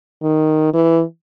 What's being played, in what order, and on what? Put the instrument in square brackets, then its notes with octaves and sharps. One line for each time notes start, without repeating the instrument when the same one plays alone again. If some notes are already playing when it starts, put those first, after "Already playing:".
[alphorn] D#3
E3